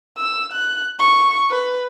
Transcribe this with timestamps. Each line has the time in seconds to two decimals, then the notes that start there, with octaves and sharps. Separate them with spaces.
0.17 E6
0.52 F#6
0.99 C#6
1.50 B4